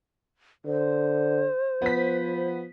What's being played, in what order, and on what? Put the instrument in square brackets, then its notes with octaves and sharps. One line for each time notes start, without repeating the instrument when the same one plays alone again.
[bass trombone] D3 [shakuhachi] C5
[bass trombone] F3 [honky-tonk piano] B3 B6